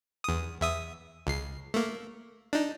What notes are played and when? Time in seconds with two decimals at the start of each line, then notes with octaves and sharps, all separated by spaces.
0.24 E2 D#6
0.61 E2 E5 D#6
1.27 C#2 C7
1.74 A3 A#3
2.53 D4 D#4